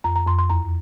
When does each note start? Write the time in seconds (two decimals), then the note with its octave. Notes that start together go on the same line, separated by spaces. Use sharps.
0.04 F2 A#5
0.16 A#5
0.27 F2 C6
0.39 C6
0.50 E2 A#5